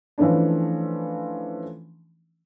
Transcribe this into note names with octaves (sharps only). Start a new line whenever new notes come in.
E3 F3 A3 C#4 D4